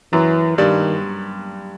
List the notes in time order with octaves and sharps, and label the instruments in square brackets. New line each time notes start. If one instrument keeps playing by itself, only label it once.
[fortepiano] F#2 F#3 [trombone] E3
[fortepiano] G2 G3 [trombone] D#3